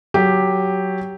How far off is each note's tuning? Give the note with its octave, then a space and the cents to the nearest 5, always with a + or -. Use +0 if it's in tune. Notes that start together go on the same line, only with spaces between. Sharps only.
F#3 +10 G4 +0